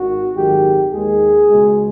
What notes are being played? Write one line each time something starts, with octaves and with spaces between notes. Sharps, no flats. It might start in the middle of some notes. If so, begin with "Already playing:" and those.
Already playing: G#1 D#3 F#4
G#1 F#2 D#3 G#3 G4
D#2 D#3 G#3 G#4
C#2 B2 G#3